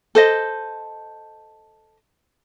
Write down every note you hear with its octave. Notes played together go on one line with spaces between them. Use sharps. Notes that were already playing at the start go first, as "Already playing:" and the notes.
A4 C5 D#5